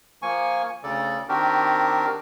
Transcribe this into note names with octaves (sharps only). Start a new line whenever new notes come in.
F3 A#3 G#5 C#6
D2 C#3 A4 D5
D#3 C4 D4 F#4 G4 A#4